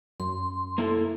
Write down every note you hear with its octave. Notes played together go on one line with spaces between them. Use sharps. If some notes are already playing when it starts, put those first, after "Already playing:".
F#2 C6
A#3 E4 A4